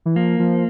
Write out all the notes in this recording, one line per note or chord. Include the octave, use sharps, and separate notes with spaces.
E3
F3 A#3
F3